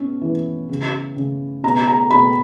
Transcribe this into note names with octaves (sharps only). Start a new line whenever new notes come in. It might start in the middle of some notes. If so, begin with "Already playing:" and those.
Already playing: B2 C#4
E3
C#3
C#3
B2 A#5
A#5
B2 B5